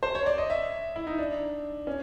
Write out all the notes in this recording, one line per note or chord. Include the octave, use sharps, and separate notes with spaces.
C5
C#5
D5
D#5
E5
E4
D#4
D4
C#4